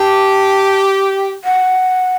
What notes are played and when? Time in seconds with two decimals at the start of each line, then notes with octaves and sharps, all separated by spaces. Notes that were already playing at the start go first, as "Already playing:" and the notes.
Already playing: G4 A5
1.44 F#5